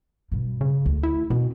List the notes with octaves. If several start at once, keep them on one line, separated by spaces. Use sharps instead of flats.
G2 B2
C#3
D2
E4
B2 C4